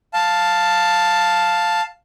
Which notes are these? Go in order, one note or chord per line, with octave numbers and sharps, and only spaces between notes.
F5 A5